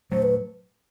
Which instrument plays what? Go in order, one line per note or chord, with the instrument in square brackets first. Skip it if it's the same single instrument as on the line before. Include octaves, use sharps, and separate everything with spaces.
[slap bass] A#2 F#3 A3 [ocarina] C5
[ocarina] B4